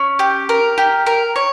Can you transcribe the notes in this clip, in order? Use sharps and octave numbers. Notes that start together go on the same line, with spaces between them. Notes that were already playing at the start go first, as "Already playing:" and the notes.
Already playing: C#4
G4
A#4
G4
A#4
C#5